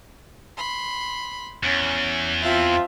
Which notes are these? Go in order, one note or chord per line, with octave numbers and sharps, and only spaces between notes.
B5 C6
E2 C#4
F3 C4 F4 E5